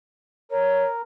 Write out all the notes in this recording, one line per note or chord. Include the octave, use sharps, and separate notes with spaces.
A#4 C#5